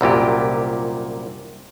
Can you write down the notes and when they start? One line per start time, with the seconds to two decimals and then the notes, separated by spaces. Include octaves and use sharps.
0.01 C2 F#2 A#2 G4